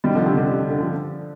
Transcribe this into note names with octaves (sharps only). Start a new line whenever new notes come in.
D#3 G3
D3 F3
C3 D#3
D3
D3
D3
D3
D3 F3